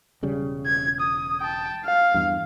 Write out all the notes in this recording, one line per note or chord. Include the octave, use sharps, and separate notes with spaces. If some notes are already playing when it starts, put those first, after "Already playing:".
E1 C#3 G3
G#6
D#6
G5 A5
F5
E2 G2